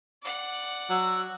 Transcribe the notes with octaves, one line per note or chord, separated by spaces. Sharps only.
D5 F#5
F#3 F#4 E6 F#6